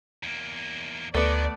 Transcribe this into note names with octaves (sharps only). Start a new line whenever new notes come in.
E2 A#3
D2 D#3 A3 B3 D5